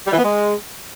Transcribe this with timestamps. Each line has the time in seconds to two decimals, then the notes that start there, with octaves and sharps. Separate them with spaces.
0.06 G3
0.12 E3
0.18 B3
0.24 G#3